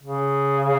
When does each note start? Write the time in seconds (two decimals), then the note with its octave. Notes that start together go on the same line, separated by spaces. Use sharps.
0.02 C#3